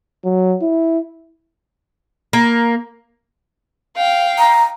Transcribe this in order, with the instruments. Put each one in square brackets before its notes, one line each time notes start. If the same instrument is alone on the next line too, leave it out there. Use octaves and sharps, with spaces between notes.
[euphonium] F#3
E4
[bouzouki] A#3
[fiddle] F5 G5
[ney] A#5